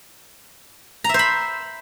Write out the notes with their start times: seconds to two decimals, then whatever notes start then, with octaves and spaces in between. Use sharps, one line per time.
1.04 A#5
1.09 E5
1.14 C5
1.19 B5